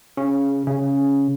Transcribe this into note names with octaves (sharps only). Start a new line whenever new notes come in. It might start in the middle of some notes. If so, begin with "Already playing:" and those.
C#3
C#3